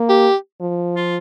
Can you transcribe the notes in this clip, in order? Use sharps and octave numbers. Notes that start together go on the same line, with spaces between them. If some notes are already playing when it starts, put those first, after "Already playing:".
Already playing: A#3
G4
F3
F4